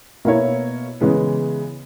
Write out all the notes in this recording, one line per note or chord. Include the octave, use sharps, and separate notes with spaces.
B2 A#3 E4 A#4 C#5
C#3 E3 G#3 B3